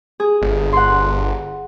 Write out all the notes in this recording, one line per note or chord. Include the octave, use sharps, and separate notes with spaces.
G#4
G1
F#5 C6